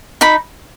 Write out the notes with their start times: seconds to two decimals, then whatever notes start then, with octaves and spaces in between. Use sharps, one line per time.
0.21 D#4 B5